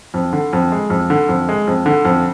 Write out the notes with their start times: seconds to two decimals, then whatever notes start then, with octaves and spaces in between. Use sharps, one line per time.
0.14 F2
0.33 D3
0.53 F2
0.72 G#3
0.90 F2
1.10 D3
1.29 F2
1.49 G#3
1.67 F2
1.86 D3
2.05 F2